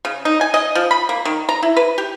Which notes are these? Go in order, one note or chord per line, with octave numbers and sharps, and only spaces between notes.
C#3
D#4
G#5
D#5
F3
B5
A#3
D#3
A#5
E4
B4
G4